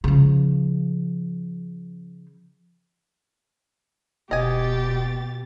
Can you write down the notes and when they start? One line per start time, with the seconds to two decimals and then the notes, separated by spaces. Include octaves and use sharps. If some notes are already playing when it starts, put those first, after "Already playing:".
0.04 C#3 F3
4.31 E1 B2 G4 D#5 G#5 A6